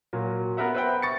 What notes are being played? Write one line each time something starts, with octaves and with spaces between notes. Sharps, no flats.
A#2 F#3
B3 A#4 B4 E5 F#5
B4 C5 E5 F#5 G5
C#6 A6 C#7